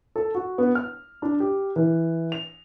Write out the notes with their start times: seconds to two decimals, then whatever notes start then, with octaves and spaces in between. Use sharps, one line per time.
0.16 A4
0.35 F#4
0.58 B3
0.75 F6
1.22 D4
1.40 G4
1.76 E3
2.32 F7